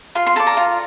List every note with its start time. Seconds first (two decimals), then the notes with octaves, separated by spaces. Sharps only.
0.15 F4 C6
0.26 C6
0.36 A4 A#5
0.39 D5
0.47 A#5
0.57 F4